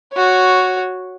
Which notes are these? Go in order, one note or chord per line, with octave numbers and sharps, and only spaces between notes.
F#4 C#5